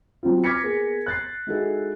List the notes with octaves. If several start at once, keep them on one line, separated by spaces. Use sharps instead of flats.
F#3 C4 C#4 F4
D6 F6 G#6 A#6 B6 C#7
A#3 B3 G#4
F#6 A6 C7
G#3 D#4 E4 F#4 G#4 A4